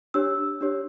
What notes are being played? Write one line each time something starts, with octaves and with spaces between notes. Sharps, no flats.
D4 G4 C#5 E6
D4 G4 C#5